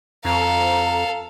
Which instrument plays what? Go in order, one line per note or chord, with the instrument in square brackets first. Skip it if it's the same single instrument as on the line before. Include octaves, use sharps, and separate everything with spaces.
[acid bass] F2 [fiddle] A4 F5 [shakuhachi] A#5